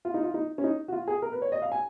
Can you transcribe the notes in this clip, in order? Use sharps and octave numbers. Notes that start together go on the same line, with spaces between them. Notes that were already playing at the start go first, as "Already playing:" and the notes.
F4
D#4
F4
D#4
C#4
D#4
F#4
F4
G#4
A#4
B4
C#5
D#5
F5
G#5